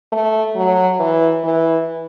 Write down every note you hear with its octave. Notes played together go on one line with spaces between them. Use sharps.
A3
F#3
E3
E3